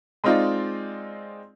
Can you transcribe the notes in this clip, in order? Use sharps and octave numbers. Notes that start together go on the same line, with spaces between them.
G#3 C4 D#4 F4 C5 D5